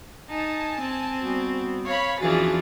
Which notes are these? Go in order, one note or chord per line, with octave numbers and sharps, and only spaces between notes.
D#4 G#5 A5
C4
G3 B3 F#4
C#5 F5 B5
E2 E3 F3 C#4 D4 F#4 G#4 A6